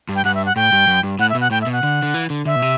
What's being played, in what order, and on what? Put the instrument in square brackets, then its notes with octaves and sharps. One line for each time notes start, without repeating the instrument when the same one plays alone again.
[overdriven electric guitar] G2
[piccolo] G5
[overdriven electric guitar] G2 [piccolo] F#5
[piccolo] E5
F#5
[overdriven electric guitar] A2 [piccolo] G5
[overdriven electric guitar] G2
F#2
G2
[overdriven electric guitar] A2 [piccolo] F#5
[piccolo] E5
[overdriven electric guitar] B2
[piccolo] F#5
[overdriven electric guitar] A2 [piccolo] G5
[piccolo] E5
[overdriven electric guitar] B2
[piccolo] F#5
[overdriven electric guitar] D3
D3
E3
D3
[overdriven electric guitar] D3 [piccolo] E5
[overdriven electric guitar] B2
C3